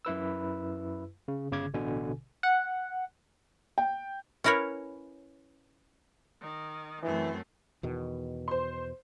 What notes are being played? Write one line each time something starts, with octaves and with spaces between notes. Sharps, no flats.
F#2 E4 B4 E6
C#3
G1 C#3 D6 G#6
A1 B2 D3 G#5
F#5
G5
C#4 E4 A#4 B4 C#5
D#3
F#2 E3 A3 C4
E2 B2 D#3
C5 C6